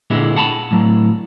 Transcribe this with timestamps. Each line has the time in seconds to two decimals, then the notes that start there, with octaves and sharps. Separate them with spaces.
0.10 A#2 D3 G#3 B3 E4
0.36 F#5 A5 B5
0.71 A2 F#3